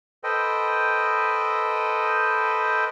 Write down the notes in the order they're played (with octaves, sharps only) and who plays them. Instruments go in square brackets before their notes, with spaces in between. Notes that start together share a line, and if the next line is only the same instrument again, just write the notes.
[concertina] A4 B4 C5 D#5 G5